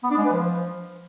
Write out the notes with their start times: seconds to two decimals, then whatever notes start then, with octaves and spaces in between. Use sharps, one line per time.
0.03 B3
0.11 D4
0.18 G#3
0.25 B4
0.32 F3